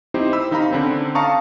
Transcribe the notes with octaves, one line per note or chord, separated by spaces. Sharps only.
C4 D#4 E4 G4 C5
B5 E6
D#3 D#4 F5 A#5 B5
D3 C4 C#4
F5 A5 A#5 C#6 D#6